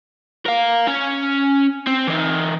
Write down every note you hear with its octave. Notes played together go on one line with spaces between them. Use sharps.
A#4 F5
C#4
C4
E3 D#4